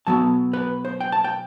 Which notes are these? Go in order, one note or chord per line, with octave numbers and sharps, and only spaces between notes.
B2 F#3 B3 A5
B4
C5
G5
A5
G5